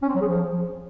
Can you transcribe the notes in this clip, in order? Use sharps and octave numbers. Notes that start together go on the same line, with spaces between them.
C#4
C4
F#3
G#4
F3